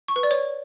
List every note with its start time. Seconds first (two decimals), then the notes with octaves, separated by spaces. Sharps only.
0.08 C#6
0.16 B4
0.23 D5
0.31 C#5